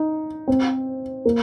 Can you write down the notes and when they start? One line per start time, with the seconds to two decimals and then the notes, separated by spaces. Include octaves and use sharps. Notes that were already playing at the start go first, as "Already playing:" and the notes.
Already playing: D#4
0.48 C4
1.25 A#3